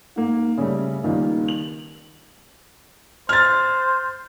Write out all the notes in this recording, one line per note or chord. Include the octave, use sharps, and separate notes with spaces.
G#2 A#3
C#3 G3 A3
C#2 D#3 G3 A#3
F#7
C5 F6 A6